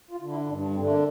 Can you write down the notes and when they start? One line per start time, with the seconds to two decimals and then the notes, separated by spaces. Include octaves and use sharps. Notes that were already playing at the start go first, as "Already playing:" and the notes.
0.11 F4
0.21 D3
0.30 E4
0.47 G2 D4
0.62 D4
0.75 D3 C4
0.82 A3
0.89 A#3